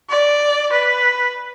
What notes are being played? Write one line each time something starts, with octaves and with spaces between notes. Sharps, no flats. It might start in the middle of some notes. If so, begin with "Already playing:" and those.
D5
B4